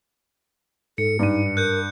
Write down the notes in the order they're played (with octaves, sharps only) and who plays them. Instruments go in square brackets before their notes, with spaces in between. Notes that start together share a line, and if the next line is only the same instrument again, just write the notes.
[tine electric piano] G#2 [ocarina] A4 [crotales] C#7
[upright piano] G2 D#7 [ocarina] D#4
[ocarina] A#4 [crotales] F#6 G6